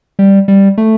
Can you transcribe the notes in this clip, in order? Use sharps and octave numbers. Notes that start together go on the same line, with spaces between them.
G3
G3
A3